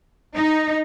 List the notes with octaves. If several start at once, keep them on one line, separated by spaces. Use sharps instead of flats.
D#4